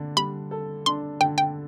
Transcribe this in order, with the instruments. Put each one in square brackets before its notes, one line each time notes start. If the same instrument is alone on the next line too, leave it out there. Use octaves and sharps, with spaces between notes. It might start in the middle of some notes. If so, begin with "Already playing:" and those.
Already playing: [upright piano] D3 D4
[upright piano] G3 [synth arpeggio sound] B5
[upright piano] A4
[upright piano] D4 [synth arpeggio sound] C6
[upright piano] D3 [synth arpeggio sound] G5
[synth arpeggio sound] G5